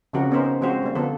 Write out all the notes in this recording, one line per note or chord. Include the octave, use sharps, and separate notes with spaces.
C#3 F3 C4 C#4 F#4 A#4
B3 C#4 D#4 A#4 C5
F3 G#3 C4 C#4 F#4 C5
G3 A#3
D3 F3 B3 A4